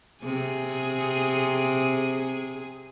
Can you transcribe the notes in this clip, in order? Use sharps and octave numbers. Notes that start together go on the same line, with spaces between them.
C3 G#4